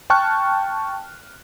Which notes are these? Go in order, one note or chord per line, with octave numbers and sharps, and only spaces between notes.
G5 A5 C#6 F6 F#6